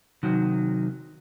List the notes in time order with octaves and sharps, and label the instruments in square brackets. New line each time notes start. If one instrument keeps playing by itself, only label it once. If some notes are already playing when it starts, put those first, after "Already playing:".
[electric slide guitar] C3 D#3 F#3